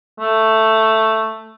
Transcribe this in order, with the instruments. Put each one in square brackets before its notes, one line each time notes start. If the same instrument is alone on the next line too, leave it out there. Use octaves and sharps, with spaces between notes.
[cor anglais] A3